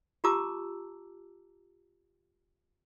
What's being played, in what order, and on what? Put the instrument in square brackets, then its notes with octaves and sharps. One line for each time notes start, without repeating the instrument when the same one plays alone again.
[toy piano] F4 G4 A5 A#5 D6 E6